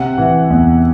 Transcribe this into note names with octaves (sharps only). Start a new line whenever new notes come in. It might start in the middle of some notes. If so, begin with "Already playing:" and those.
Already playing: C3 F#5
E3
E2